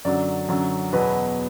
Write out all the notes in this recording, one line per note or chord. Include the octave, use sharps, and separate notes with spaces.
F#2 D3 F#3 D5
F#2 D3 F#3
E2 B2 F#3 B4